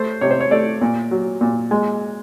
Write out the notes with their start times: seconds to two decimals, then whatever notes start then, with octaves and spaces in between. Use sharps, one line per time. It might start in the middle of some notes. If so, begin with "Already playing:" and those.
Already playing: A3 C5
0.21 C3 C#5
0.31 C5
0.41 C#5
0.51 A3 D5
0.81 A#2
1.11 F#3
1.41 A#2
1.71 G#3